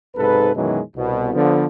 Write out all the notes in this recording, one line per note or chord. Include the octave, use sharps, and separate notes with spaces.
B1 G#2 C3 A4 B4
F#2 B2 D#3 E3 F#3 G#3
C2 B2
D3 F3 B3